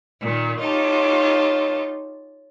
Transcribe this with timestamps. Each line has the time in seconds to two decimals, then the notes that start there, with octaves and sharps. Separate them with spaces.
0.21 A#2 D#3
0.59 D#4 F4 G4 C#5 A5